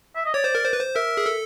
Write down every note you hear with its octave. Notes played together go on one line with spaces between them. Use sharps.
E5
D#5
C#5 D5
C5
A#4
C5
B4
C5
A#4 E5
G#4
A4